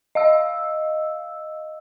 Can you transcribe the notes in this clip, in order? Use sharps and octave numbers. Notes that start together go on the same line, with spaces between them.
D#5 F5 E6